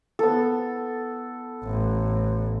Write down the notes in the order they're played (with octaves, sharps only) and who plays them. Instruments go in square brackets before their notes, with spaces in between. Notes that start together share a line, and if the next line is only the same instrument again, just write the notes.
[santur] B3 A4
[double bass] A1